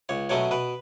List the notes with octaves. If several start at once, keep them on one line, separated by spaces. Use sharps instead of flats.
C#2 C#5
B2 F#3 A3 C#4 C#5
B2 B4